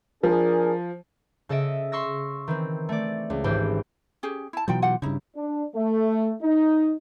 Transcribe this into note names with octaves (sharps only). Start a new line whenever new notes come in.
F3 D4 G#4 A#4
C#3 A4 D#5 E5 D7
C6 C#6 E6 A#6
D#3 E3 C4
A3 D5
C#2
G#1 G#2 E3 G4 C5
C#4 G4 G#4
E4 A5
B2 E3 F#3 D#4 F4 G5
F4 G4 F#5
G2 C#3 D#4 E4
D4
A3
D#4